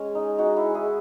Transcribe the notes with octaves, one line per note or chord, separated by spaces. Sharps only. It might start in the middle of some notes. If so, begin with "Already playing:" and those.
Already playing: G#3 C#4
D#4
D#4 F#4
E4 G#4
E4 G#4